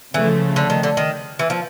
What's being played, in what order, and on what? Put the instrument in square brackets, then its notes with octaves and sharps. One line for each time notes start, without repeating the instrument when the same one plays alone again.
[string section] C#3 F3 A3 [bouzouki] E3
[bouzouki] D3
D#3
D3
D#3
E3
F3